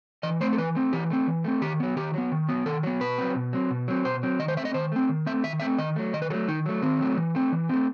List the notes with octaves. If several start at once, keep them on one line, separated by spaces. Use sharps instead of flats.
E3 D#5
A3 C4 C5
A4
E3 B4
A3 C4
E3 G4
A3 C4
E3
A3 C4
D#3 G4
F#3 B3
D#3 G4
F#3 B3
D#3
F#3 B3
D#3 A4
F#3 B3
B2 B4
F#3 C4
B2
F#3 C4
B2
F#3 C4
B2 C5
F#3 C4
D#3 D#5
C5
A3 C4 E5
D#5
D#3 C5
A3 C4
D#3
A3 C4 E5
D#3 E5
A3 C4 E5
D#3 D#5
F#3 A3
D#3 D#5
B4
F#3 A3 A4
D#3 D#4
F#3 A3
D#3 C4
F#3 A3
E3
A3 C4
E3
A3 C4